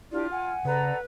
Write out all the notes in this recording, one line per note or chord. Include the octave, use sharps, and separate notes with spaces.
D4 E4 F4 G4 D5
F#5 G#5
C#3 A4 B4 D5 A#5